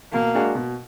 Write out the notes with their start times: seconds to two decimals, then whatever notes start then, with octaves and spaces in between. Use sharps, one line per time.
0.13 B2 A#3
0.34 G#3 D4 F#4
0.55 B2